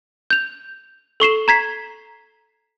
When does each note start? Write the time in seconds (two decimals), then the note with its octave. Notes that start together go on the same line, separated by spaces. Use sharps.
0.30 G6 F7
1.20 A4 C#6 C7 E7
1.48 A#5 G#6 B6 C7